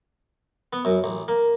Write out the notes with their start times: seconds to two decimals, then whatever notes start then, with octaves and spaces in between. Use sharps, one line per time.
0.73 B3
0.85 F#2
1.04 A1
1.28 A#3